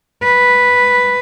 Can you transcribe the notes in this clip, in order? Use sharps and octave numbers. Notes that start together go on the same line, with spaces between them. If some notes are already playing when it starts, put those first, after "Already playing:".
B4